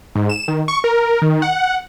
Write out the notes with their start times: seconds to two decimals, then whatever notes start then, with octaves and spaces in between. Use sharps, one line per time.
0.16 G#2
0.29 E7
0.48 D#3
0.68 C#6
0.84 A#4
1.22 D#3
1.42 F#5